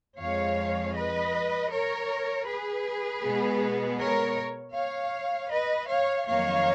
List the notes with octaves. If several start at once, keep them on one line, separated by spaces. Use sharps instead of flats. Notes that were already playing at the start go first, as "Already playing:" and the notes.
F2 F3 G#3 C#5 F5
B4 D#5
A#4 C#5
G#4 B4
B2 G#3 B3
A#4 C#5
C#5 F5
B4 D#5
C#5 F5
F2 D#3 F#3 A#3 C#5 F5